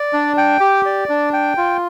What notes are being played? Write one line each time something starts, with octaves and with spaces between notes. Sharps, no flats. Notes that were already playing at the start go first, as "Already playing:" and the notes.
Already playing: D5
D4
G5
G4
D5
D4
G5
F4